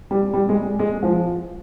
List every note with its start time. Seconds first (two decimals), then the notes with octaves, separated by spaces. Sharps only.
0.11 G3
0.34 G3
0.49 G#3
0.79 G#3
1.03 F3